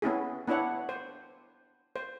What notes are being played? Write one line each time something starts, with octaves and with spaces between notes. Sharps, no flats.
B3 C#4 E4 G#4
B3 D4 E4 C#5 F#5
C5
C5